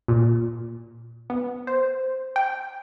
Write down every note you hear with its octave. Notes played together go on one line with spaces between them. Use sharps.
A#2
B3
C5
G5